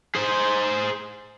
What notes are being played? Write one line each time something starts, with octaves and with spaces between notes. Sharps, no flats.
G#4 C5